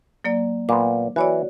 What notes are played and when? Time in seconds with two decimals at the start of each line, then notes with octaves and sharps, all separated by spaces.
0.24 F#3 A#3 D5
0.69 A#2 B3 D6
1.16 E3 F#4 C#5 D5